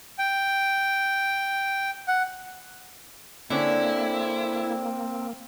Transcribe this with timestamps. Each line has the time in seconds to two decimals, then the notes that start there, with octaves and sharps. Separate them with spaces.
0.19 G5
2.08 F#5
3.50 D3 A#3 C4 C#4 E4